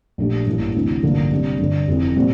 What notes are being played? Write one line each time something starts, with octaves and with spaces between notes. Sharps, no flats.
A#1 A#2 A3 D4 G4
A1 G2 E3 A#3
D2 C3 E3 A3 D4
A1 G2 D3 F3 A#3
C3 G3 D4
G1 G2 D3 G3
F1 F2 E3
A#2 G3 C4